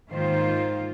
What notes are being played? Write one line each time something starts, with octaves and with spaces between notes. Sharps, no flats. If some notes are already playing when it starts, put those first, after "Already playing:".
G#2 D#3 A#3 F4 C5